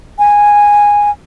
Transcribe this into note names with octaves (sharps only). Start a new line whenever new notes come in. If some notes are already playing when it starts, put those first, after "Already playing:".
G#5